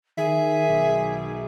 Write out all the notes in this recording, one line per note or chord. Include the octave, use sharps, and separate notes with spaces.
D#3 G#4 E5
B1